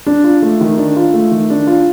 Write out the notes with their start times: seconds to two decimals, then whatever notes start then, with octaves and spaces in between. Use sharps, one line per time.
0.06 D4
0.24 F4
0.42 A3
0.61 D#3
0.78 D4
0.96 F4
1.14 A3
1.31 D#3
1.50 D4
1.67 F4